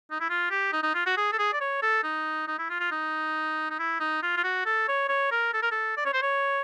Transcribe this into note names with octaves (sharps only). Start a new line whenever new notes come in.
D#4
E4
F4
G4
D#4
D#4
F4
F#4
G#4
A4
G#4
D5
C#5
A4
D#4
D#4
E4
F4
F4
D#4
D#4
E4
D#4
F4
F4
F#4
A4
C#5
C#5
A#4
A4
A#4
A4
D5
C#5
C5
C#5